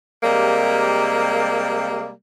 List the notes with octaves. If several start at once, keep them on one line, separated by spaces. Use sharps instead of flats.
C3 G3 G#3 A#3